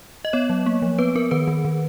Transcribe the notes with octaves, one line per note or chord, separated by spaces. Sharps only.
D#5
B3 C#5
F#3
A#3
F3
B3 B4
B3 A#4
D#3 B4
D#3
D#3